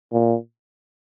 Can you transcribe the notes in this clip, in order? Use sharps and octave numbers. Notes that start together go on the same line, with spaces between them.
A#2